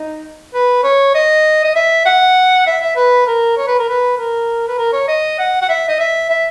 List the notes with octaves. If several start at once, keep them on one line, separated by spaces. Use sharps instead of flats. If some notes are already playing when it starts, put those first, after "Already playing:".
Already playing: D#4
B4
C#5
D#5
D#5
E5
F#5
E5
E5
B4
A#4
C#5
B4
A#4
B4
A#4
B4
A#4
C#5
D#5
F#5
F#5
E5
D#5
E5
E5